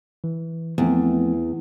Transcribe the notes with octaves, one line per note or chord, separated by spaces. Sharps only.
E3
E2 F3 A3 C4